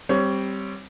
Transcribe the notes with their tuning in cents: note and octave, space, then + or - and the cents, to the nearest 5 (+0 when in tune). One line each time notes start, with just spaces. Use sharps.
G3 +0 C4 +0 C#5 +20